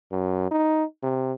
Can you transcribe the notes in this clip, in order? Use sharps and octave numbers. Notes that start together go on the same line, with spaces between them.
F#2
D#4
C3